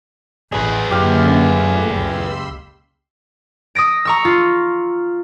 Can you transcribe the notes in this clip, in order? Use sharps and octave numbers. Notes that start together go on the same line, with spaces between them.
A1 G#4 B4 D#5
F#2 D3 A#3 C#4 G4 F5
A#2 A3
F#1 C#2 B5 C6 E6
D#6 E6 A#6 D7
A#5 C#6 E6
F4